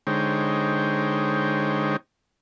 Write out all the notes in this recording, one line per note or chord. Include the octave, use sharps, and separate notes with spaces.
D3 G#3 D#4 C5 C#5 G5